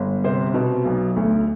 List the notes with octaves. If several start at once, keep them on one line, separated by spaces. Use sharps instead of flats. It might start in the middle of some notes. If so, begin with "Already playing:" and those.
Already playing: G1
C3 C5
B2
B1
D2